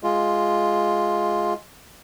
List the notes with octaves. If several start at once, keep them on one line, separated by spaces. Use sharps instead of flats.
G#3 F4